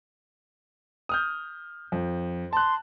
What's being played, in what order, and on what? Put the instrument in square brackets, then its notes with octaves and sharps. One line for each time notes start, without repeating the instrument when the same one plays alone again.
[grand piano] D#6 F6 G6
F2
[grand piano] A5 F#6 [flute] C6